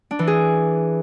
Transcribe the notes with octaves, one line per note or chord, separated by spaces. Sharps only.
D4
E3
G#4